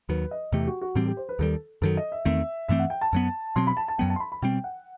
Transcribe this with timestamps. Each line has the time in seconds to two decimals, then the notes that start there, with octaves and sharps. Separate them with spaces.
0.09 D#2 D#3 F#3 B4
0.31 D#5
0.52 E2 C3 E3 A3 G4
0.67 F#4
0.81 F#4
0.95 A2 E3 G3 C4 G4
1.06 G4
1.17 C5
1.29 B4
1.39 D#2 D#3 G3 A4
1.82 F#2 D#3 F#3 A4
1.97 D#5
2.12 E5
2.25 E2 D#3 A3 C4 E5
2.68 G2 E3 A3 C4 E5
2.79 F#5
2.90 G5
3.01 A5
3.13 F#2 F#3 B3
3.56 B2 F#3 C4 C6
3.67 B5
3.77 A5
3.88 A5
3.98 F#2 F#3 B3 G5
4.10 A5
4.16 C6
4.20 B5
4.32 B5
4.42 B2 G3 C4 G5
4.64 F#5